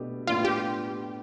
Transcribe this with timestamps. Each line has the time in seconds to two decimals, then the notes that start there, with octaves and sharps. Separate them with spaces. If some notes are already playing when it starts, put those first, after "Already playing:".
Already playing: B2 A3 D4 G4 B4
0.27 A2 G3 B3 D4 F4
0.45 G4